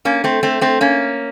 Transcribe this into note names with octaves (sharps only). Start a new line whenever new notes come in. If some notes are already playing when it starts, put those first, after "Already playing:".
A#3 C#4
A3 C4
A3 C4
A3 C4
A#3 C#4